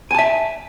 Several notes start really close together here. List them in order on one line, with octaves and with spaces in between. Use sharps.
G#5 A5 E5